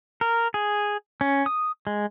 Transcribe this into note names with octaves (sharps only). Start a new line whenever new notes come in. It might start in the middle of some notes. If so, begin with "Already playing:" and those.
A#4
G#4
C#4
D#6
G#3